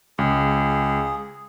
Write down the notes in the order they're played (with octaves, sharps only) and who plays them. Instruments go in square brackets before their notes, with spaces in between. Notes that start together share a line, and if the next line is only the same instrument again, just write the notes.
[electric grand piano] C#2 [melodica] G#4